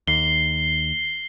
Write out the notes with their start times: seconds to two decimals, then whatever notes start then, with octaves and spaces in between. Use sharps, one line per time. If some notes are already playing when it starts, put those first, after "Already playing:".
0.07 D#2 C7 G7